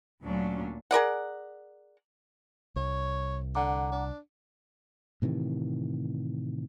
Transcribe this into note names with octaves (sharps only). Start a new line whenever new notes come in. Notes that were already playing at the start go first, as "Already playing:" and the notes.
D2 A#2 F#3 C#4 D4
G#4 A#4 D5 F#5
C2 C#5
D3 F#5 A#5 D6
D4
A2 C3 D#3 E3